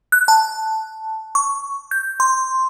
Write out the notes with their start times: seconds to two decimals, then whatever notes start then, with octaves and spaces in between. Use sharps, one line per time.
0.12 F#6
0.28 A5
1.35 C#6
1.91 G6
2.20 C6